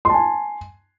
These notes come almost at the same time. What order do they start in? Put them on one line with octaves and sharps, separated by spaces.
C6 A5 G#5